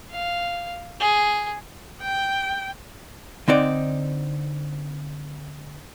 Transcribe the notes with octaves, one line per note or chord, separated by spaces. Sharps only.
F5
G#4
G5
D3 C4 D#4 D5